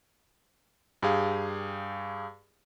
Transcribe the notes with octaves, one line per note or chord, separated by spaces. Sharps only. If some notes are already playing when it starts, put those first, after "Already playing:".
G2 G4 G#4 F5